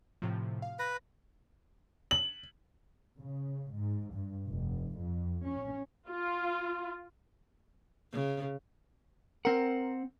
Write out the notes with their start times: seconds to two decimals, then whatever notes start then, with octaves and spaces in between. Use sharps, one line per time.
0.22 A2 C3 F3
0.62 F5
0.79 B4 A#6
2.11 F#7
3.18 C#3
3.73 G#2
4.13 G2
4.49 F1
4.98 F2
5.47 C#4
6.09 F4
8.12 C#3
9.45 C4 A#4 F#5